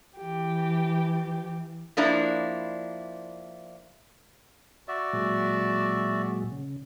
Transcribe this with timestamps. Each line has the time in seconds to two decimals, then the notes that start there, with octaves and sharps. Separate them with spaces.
0.17 E3 G4
1.97 F3 A#3 D4 E4
4.88 F#4 D5 E5
5.13 A#2 F#3 G#3
6.52 C#3